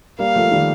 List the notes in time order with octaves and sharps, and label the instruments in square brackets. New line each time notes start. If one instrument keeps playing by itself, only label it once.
[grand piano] G3 A#3 [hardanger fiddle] F5
[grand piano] F3 A3
D#3 G3